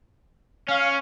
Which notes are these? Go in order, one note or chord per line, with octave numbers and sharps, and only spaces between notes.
C#4 C#5 F5